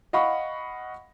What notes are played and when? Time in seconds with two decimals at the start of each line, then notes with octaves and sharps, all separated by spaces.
0.13 D#5 F5 F#5 B5 C#6